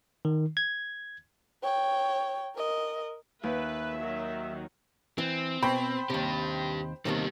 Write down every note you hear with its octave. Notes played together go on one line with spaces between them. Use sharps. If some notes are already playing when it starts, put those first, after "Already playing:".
D#3
G#6
C#5 G5
A#4 D#5
D#2 B4 E5
D#3 F#3
E3 C4
B2 C5 G5 B5
D#2 C3 D4 G4
D#2 C3 D#3 G3 B3